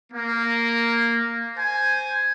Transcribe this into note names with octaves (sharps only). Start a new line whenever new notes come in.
A#3
C5 G#5